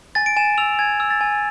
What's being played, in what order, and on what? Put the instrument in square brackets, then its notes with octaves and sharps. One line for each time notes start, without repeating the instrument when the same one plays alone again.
[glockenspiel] G#5 A6
D7
G#5 E7
E6 F7
G#5 G#6
E6
A6
G#5